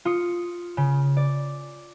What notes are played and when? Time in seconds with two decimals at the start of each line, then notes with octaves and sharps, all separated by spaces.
0.05 F4 D#6 C#7
0.77 C#3
1.17 D5